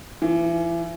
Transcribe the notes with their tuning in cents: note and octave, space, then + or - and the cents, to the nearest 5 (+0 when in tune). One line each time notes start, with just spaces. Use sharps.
E3 +35